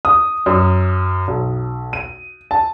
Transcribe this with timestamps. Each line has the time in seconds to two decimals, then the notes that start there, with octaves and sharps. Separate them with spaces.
0.05 D#6
0.46 F#2
1.28 B1
1.93 D#7
2.51 A5